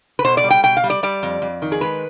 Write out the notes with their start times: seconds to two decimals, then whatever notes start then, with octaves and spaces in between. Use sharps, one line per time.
0.19 B4
0.24 B2 C5
0.37 D5
0.44 G3
0.50 G5
0.63 B2 G5
0.77 F5
0.84 G3
0.90 D5
1.03 G3 D5
1.23 F2
1.42 F2
1.62 D#3
1.72 G#4
1.81 G#3 B4